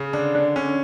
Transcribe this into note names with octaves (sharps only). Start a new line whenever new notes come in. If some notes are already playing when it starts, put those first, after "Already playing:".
Already playing: C#3
D3 D4
D3
D3 C#4